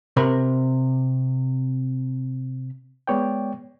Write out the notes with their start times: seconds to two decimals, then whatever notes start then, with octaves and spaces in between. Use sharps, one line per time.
0.17 C3 A#4 B5
3.07 G#3 B3 C#5 D5 G5